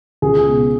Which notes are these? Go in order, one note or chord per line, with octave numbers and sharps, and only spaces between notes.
C#2 G#4
B2